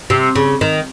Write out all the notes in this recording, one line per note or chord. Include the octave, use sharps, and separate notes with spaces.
C3
C#3
D#3